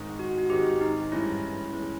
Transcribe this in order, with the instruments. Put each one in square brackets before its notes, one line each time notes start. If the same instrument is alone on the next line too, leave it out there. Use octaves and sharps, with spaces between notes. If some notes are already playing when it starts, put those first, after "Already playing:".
Already playing: [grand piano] G#2 D#3 G#3 C4 D#4
[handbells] F#4
F#4
[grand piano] G#2 D#3 G#3 C4 D#4 [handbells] G4
[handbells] D#4
[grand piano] G2 E3 G#3 C#4 [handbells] E4
[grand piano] E3 G#3 C#4